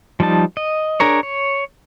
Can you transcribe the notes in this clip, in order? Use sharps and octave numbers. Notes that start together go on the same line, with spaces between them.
F3 G3 D#4 A5
D#5
D4 G#4 A#4 C#5
C#5